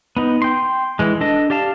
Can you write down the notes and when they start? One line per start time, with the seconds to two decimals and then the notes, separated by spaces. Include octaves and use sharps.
0.17 B3 D#4
0.42 G5 C6
0.99 E3 G#3
1.21 D4 A4 D#5
1.50 G4 D5 F5 A5